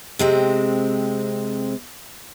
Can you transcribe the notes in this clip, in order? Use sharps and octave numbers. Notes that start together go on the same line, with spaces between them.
C3 G#3 C4